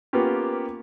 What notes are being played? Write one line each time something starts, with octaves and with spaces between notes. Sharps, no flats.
A#3 B3 C#4 F4 G4